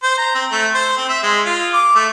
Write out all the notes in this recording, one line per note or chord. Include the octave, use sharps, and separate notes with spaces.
C5
A#5
C4
A3
C5
C4
E5
G#3
F4
D6
A3